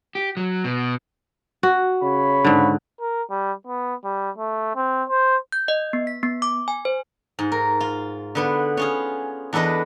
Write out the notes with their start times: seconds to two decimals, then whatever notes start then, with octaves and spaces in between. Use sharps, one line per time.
0.15 G4
0.37 F#3
0.64 B2
1.63 F#4
2.03 C#3 C#5 B5
2.45 G#2 D3
3.00 A#4
3.30 G3
3.67 B3
4.04 G3
4.38 A3
4.76 C4
5.09 C5
5.52 G6
5.68 D#5
5.93 B3
6.07 B6
6.23 B3
6.42 D6
6.68 G#5
6.85 C5
7.39 G#2
7.52 A#4
7.80 F4
8.35 D3 B3 B4
8.77 C#4 F4 G#4
9.53 E2 D4 A4 B4 D#5